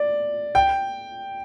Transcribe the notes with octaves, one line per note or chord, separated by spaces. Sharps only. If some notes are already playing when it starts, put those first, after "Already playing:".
Already playing: D5
G5